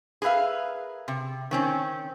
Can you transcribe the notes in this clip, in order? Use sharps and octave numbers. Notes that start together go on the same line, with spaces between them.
G#4 A#4 B4 E5 F5
C3
D#3 C4 C#4